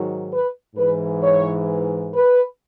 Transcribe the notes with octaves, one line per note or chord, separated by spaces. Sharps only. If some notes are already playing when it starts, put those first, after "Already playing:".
Already playing: G#2 D#3 F#3
B4
G#2 E3 B4
C#5
B4